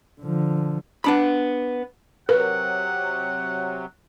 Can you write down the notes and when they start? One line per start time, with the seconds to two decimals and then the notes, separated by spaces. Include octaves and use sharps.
0.21 D3 F3
1.04 B3 D4 B5
2.29 C3 F#3 A#4 B4 F#5